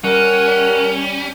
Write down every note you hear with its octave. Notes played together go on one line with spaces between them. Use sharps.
G3 C#4 A#4 F#5